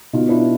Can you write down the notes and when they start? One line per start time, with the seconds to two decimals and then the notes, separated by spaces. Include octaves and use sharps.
0.13 B2 D#4 F4
0.29 D4 E4